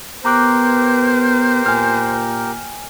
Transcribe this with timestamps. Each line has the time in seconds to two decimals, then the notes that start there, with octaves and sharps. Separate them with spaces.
0.25 B3 G4 A#4 C5 A#5 D6 F#6
1.66 A#2 G#5 F6